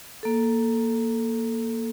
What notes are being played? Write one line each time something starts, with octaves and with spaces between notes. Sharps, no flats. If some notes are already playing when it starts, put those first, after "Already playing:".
A#3 A4